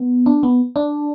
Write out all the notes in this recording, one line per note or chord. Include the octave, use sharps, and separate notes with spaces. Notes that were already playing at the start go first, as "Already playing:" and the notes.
Already playing: B3
D4
B3
D4